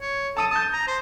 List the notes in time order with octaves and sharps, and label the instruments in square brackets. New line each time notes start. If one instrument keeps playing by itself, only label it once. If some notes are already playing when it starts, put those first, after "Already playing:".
[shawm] C#5
[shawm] A4 [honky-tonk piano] A5 D#6 D#7
[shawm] A5 [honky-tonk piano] D#6 G6
[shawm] A#5
C5